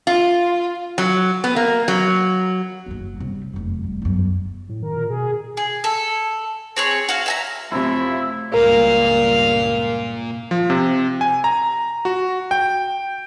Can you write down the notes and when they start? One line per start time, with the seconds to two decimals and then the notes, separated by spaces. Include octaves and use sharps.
0.07 F4
0.98 F#3
1.44 B3
1.56 A#3
1.88 F#3
2.86 F#1 F#2
3.17 C3 G3
3.53 F1 F#2
3.83 G3
4.02 G1 F#2
4.69 A2
4.82 D#3 A#4
4.96 A#2
5.10 B2 G#4
5.57 G#4
5.84 A4
6.77 C4 G#4 C#5
7.09 F#4 F5
7.26 E5 G#5 A#5
7.72 F#2 C3 F3 A3 E4
8.54 C#2 G2 A#2 A#3 A#4 F5
10.51 F3
10.70 C3
11.21 G#5
11.44 A#5
12.05 F#4
12.51 G5